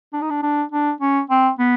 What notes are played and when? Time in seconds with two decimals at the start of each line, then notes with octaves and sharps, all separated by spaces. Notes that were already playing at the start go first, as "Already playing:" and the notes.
0.13 D4
0.21 D#4
0.30 D4
0.43 D4
0.72 D4
1.01 C#4
1.30 C4
1.59 B3